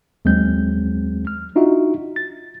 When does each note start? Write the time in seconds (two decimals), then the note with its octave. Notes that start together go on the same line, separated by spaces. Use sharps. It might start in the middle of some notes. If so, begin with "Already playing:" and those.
0.25 D#2 F#3 G#3 C4 G6
1.27 F6
1.56 D4 D#4 F4 F#4 E5
2.16 A6